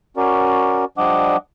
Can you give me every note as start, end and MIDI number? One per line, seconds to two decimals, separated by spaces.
0.17 0.85 61
0.17 0.85 66
0.17 0.85 70
0.17 0.85 74
0.98 1.37 53
0.98 1.37 55
0.98 1.37 62
0.98 1.37 75
0.98 1.37 78
0.98 1.37 86